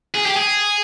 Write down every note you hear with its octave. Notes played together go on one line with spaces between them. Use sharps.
G#4
G4
G#4